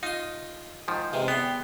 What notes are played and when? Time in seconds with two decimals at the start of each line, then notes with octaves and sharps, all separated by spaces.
0.03 D#4 F4 D#6
0.88 G#2 D#3 F3
1.13 C3 E3 G#3
1.28 E2 B3 G5 C6